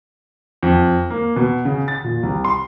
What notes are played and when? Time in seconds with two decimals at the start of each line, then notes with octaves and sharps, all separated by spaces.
0.63 F2
1.10 A#3
1.36 B2
1.65 C#3
1.88 A6
2.04 A#2
2.23 C2
2.45 C6